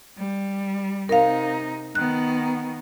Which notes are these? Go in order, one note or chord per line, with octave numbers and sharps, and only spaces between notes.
G3
C3 D#4 A#4 F5
D#3 B3 F#6